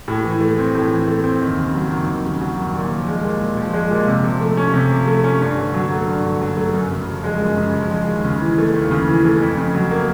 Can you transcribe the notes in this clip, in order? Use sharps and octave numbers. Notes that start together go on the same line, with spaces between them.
A2
E3
A3
C4
A2
E3
A3
C4
D#2
C#3
F#3
D#2
D#2
C#3
F#3
D#2
A#2
F3
G#3
A#2
A#2
F3
G#3
A#2
C3
F3
A3
C#4
C3
F3
A3
C#4
G2
D3
F#3
A3
G2
D3
F#3
A3
F#2
C#3
F3
G#3
F#2
C#3
F3
G#3
D#2
C#3
E3
A3
D#2
C#3
E3
A3
F2
C#3
F#3
A#3